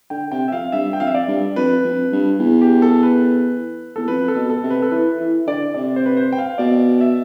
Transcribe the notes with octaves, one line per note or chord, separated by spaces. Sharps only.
D3 G5
C3 G5
E5
F2 F5
G2 E5
G5
F2 F5
E5
D5
G2
F2 B4
F2
G2
E2
G4
A4
B4
E2 A4
F2 B4
A4
B2
A4
C3
B4
A4
E3 B4
E3
D3 D5
C3 D5
C5
B4
C5
G5
F5
B2 D5
E5